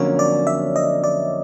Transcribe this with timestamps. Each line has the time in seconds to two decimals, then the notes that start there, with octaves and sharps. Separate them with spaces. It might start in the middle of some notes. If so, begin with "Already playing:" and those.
Already playing: F2 D3 F#3 A#3 C#4 C#5
0.19 D5
0.47 E5
0.76 D#5
1.04 D5